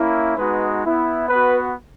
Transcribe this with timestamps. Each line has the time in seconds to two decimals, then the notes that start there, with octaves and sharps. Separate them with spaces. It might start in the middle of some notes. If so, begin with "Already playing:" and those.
Already playing: A#3 C#4 E4
0.36 G#3 B3 D#4 F#4 B4
0.83 B3 E4
1.29 B3 F#4 B4